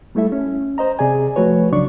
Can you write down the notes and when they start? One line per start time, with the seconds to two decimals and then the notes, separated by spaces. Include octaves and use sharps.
0.15 G3 A3 E4 A4 E5
0.32 C#4
0.78 C5 D#5 A#5
0.99 C3 G#4 D5 G#5
1.36 F3 A3 F#4 B4 C#5
1.72 C2 C#3 F#3 D4 D5 C#6